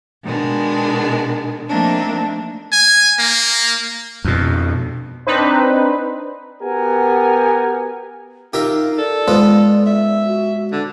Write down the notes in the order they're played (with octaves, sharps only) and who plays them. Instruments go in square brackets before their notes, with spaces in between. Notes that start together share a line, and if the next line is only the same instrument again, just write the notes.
[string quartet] B2 D#3 G#3 D4
F3 A3 A#3 C4 D4 D#4
[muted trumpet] G#5
A#3
[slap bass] F2 B2
[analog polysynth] C4 D4 D#4 B4 C5
[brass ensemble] B3 F#4 G4 A#4 F#5 G#5
[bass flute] D#4 [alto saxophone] F4 [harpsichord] G4 A#4 E5
[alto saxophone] A4 [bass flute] D5
[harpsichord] G#2 B3 F4
[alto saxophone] E5
[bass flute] F#4
[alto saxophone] D3 [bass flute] F#4